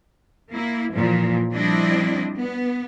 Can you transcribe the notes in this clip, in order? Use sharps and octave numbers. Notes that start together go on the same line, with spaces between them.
A#3 E4
A#2 E3 F3
F3 G3 C4 D4 E4 D#5
B3